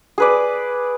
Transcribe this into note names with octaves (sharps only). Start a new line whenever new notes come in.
G#4 B4 D5